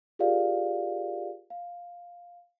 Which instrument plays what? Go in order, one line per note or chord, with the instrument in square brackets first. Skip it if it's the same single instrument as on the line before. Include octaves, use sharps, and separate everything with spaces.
[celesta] F4 G4 G#4 A#4 D5 F5
F5